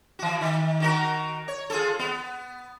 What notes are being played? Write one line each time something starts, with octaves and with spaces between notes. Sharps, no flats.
E3 F#4
D#3
D#3 F#4 A#4
C#5
F4 G#4 A4
B3